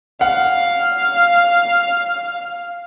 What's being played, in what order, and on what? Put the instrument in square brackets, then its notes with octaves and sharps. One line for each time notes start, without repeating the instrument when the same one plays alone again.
[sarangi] F5 [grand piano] F#5